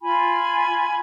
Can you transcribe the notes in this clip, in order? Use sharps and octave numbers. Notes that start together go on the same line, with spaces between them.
F4 G#5 B5